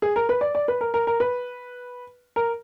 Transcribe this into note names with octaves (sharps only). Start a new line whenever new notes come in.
G#4
A#4
B4
D5
D5
B4
A#4
A#4
A#4
B4
A#4